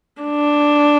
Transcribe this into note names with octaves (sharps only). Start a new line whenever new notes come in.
D4